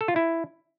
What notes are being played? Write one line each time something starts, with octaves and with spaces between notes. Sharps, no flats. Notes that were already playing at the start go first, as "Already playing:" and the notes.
A4
F4
E4